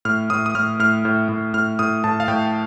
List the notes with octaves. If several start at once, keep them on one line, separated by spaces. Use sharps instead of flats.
A2 F6
A2 D#6
D#6
A2 F6
A2 F6
A2
A2
A2 F6
A2 D#6
A2 A5
F5
A2 G5